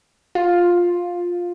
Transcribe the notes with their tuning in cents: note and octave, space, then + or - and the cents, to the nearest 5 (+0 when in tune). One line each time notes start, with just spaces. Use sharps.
F4 +10